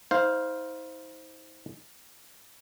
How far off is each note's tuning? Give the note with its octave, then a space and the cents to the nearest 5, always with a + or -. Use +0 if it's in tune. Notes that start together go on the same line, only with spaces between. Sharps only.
D#4 +45 C5 +0 F5 +0